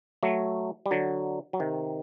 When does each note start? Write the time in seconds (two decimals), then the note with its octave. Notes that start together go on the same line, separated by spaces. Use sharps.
0.23 F#3 A3
0.86 G3
0.91 D3 F#3
1.53 F#3
1.60 C3 D#3